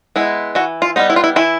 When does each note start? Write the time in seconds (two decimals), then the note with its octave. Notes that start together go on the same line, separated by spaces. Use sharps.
0.16 G#3 B3 E4
0.55 E3 F#4
0.82 F4
0.96 G3 B3 D#4
1.10 E4
1.16 F4
1.24 E4
1.36 E3 E4